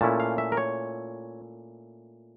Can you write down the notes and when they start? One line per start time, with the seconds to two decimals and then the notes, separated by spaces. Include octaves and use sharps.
0.01 A#2 A3 C#4 E4 A5
0.20 F5
0.38 E5
0.52 A#4
0.57 C#5